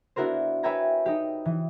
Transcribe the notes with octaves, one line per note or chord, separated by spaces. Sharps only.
B3 D4 E4 F#4 A#4 C5
B4 C#5 E5 G5 G#5 A#5
D#4 G4
E3